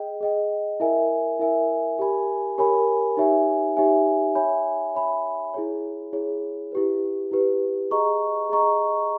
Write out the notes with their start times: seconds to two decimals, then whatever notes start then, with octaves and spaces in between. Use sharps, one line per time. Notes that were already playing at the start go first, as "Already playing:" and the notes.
Already playing: G#4 D#5 G5
0.21 G#4 D#5 G5
0.80 E4 A#4 E5 G#5
1.39 E4 A#4 E5 G#5
1.99 G4 A#4 C#5 G#5 B5
2.58 G4 A#4 C#5 G#5 B5
3.17 D#4 G4 C#5 E5 G#5
3.77 D#4 G4 C#5 E5 G#5
4.35 C#5 E5 G#5 B5
4.95 C#5 E5 G#5 B5
5.54 E4 G#4 C#5
6.13 E4 G#4 C#5
6.72 E4 G4 B4
7.31 E4 G4 B4
7.91 G#4 D#5 A#5 C#6
8.50 G#4 D#5 A#5 C#6